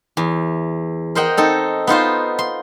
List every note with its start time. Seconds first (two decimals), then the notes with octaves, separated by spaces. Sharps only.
0.17 E2
1.15 A#4 C5 D#5 F#5 G5
1.37 C4 D#4 A4
1.87 B3 D#4 F4 C5
2.39 C6